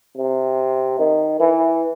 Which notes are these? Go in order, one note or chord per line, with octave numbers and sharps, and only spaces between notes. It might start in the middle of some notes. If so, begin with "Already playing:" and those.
C3
D#3
E3